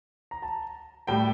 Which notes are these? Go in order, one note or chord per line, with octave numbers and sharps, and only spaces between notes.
A#5
A5
A2 G3 G5